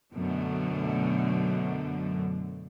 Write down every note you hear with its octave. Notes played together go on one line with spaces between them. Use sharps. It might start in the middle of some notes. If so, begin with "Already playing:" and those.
F#2 B2 D3 A3